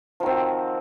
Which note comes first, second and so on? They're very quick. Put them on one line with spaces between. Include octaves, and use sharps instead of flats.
F3 D#3 C4 F#4